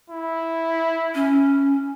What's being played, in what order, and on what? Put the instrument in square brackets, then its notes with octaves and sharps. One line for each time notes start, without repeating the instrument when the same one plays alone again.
[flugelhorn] E4
[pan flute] C#4